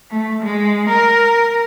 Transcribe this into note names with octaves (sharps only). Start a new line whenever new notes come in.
A3
G#3
A#4